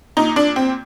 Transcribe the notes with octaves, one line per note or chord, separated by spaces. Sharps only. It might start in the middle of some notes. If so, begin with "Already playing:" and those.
A#2 D#4
D4
C4